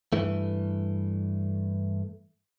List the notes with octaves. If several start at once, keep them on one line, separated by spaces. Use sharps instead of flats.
G2 E3 A3